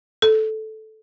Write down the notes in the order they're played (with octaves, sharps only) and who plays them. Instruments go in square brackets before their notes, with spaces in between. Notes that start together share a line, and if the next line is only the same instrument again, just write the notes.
[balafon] A4